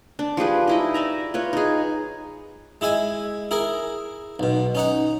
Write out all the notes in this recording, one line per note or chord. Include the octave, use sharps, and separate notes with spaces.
D4
F3 G4 G#4 B4
D#4 E4 D#5
D5 E5 A#5
F4 B4 C#5
D#4 G#4
G#3 E4 E5 G#5
E4 G#4 A#4
B1 B2
C#4 D#4 F#5